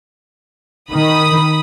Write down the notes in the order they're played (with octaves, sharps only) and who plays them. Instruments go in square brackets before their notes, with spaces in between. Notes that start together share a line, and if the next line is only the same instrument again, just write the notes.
[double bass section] D#3 [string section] B5 D#6